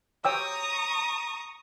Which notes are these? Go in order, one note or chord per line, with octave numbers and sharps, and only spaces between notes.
C#5 G5 A#5 C#6 D#6 E6